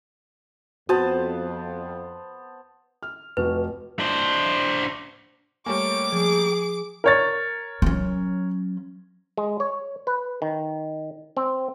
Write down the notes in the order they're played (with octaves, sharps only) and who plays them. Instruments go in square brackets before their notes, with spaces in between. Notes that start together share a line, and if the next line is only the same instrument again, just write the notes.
[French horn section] F2 [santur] B3 C5 A5 [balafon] F#4
[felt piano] F6
[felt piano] F1 F#4 [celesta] B4
[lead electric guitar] D4 C5
[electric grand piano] G3 A3 A#3 [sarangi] C#5 [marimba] G#5 [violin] D6 D7
[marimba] F3 [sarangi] G#4
[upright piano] A#4 C#5 A6
[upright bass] F#3 C#4
[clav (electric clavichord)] G#3
C#5
B4
D#3
C4